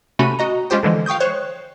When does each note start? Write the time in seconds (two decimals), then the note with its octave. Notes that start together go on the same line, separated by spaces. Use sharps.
0.19 C3 A3 C#4 F#4 B5 D#7
0.39 F#4 D#5 A#5
0.70 G#3 C#4 F4 G4 C5 G5
0.83 D3 E3 F3 G#3
1.06 F5 G5 C#6 D#6 G6
1.20 C5 C#5 C#6 F#6